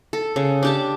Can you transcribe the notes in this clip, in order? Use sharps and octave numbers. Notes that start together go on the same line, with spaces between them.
A4
C#3
D4 G4 A5